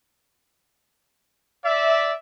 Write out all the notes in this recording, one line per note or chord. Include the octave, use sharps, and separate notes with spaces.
D5 E5